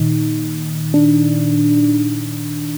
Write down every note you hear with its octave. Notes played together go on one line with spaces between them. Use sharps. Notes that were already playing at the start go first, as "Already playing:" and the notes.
Already playing: A#2 D#3 D#4
D4